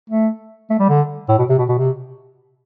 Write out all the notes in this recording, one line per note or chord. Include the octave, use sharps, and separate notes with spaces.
A3
A3
G3
D3
A2
B2
C3
B2
B2
C3